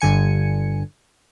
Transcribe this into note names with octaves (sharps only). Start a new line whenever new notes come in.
G1 G2 D3 G#5 C#7